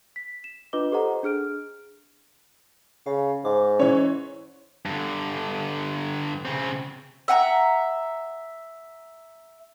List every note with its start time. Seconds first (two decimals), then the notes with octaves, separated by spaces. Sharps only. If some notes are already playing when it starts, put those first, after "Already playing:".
0.16 B6
0.44 E7
0.73 D4 F4 B4 D#5 D6 G7
0.92 G4 A4 C5 D#5 F#5 A#5
1.23 D4 G#4 F6 D7
3.06 C#3 F5
3.45 G#2 D6
3.80 E3 C#4 C#5
4.86 G2 D3
6.45 C#3 C4
7.28 E5 F#5 G#5 A#5